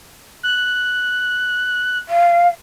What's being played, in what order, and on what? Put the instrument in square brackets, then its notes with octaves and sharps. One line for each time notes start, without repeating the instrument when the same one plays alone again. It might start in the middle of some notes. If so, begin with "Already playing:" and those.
[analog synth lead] F#6
[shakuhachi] F5